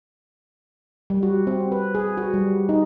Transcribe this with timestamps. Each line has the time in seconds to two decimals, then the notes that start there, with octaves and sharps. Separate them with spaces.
1.10 G3
1.23 F#4
1.47 C4
1.72 B4
1.95 G#4
2.17 F#4
2.34 G3
2.69 D#4